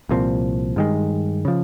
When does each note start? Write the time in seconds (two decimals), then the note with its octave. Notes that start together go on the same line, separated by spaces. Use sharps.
0.09 C2 A#2 F3 C4
0.76 G2 D#3 G#3
1.45 C#3 F3